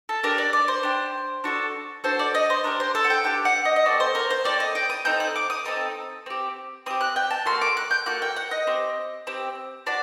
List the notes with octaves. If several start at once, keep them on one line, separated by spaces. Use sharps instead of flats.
A4
D4 G4 A#4
D5
D5
C5
D4 G4
D4 F#4 A4
D4 F#4 A4 C5
D5
D#5
C5
D4 G4 A#4
C5
A4
F#5
G5
D4 G4 G5
F#5
D#5
D#5
C4 F#4 A4 D5
C5
A#4
C5
C4 F#4 A4 D5
D#5
G5
D#6
C4 D#4 A4 G6
F#6
D6
D#6
C4 D#4 A4 D#6
C4 G4
C4 G4 D#6
F#6
G5
A5
A#3 F#4 A4 C6
D6
F#6
G6
A#3 F#4 A4 F#6
G5
F#5
D#5
C4 G4
C4 G4
D4 F#4 D5